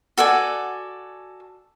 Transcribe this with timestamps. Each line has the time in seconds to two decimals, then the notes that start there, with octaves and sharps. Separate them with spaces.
0.18 F#4 A4 D5 G#5